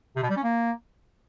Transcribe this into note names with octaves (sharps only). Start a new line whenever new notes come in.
C3
B2
G3
C#4
A#3